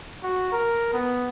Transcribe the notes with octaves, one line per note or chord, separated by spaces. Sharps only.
F#4
A#4
B3